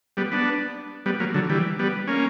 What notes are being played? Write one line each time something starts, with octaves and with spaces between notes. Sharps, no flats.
G3 B3
B3 D4
G3 B3
F#3 A#3
D3 F#3
E3 G3
G3 B3
A#3 C#4